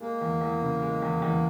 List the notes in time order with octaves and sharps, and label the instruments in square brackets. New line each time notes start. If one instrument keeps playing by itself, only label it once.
[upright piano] G#3 [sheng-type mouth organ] A#3
[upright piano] E2
E2
C#3
G#3
E2
E2